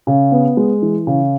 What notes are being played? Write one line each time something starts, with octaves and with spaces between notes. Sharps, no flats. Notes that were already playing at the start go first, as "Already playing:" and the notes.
C#3
B3
G#3
E3
C#3